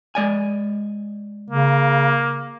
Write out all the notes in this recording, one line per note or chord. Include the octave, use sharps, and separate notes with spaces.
G#3 D5 G#5
C#3 A#3